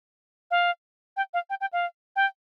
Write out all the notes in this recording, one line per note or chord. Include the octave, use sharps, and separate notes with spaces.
F5
G5
F5
G5
G5
F5
G5